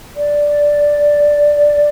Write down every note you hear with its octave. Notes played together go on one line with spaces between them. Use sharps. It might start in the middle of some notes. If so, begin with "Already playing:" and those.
D5